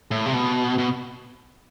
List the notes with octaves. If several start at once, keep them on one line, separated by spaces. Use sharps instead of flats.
A2
C3
B2
B2